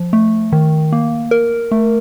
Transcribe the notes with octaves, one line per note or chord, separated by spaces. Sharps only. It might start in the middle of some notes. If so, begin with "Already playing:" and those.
Already playing: F3
A3
D#3
A#3
A#4
A3